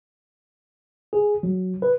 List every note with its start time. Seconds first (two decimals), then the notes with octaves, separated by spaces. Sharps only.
1.13 G#4
1.43 F#3
1.82 B4